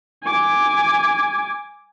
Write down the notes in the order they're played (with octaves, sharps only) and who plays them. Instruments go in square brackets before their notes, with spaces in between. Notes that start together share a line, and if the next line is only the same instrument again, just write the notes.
[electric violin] G#5 D6